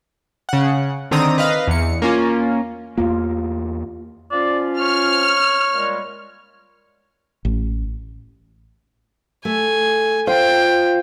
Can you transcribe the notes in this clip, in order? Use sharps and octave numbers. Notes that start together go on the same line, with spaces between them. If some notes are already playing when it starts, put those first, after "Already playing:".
C#3 F#5
D3 D#3 C4 A#5 D#6
B4 D#5 F5
E2 C#7
A#3 C#4 F4
E2 A#3 F4
F3 C#4 F4 D5
C#5 F6
A#2 G3 G#3
A1
A3 G#5
F4 C5 G5